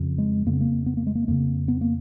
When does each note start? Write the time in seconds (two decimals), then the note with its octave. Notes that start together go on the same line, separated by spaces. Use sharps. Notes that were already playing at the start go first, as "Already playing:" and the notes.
Already playing: F2 C#3
0.18 G#3
0.46 F2 C#3 A#3
0.53 B3
0.61 A#3
0.86 B3
0.97 A#3
1.07 G#3
1.15 A#3
1.28 F2 C#3 A#3
1.68 B3
1.81 A#3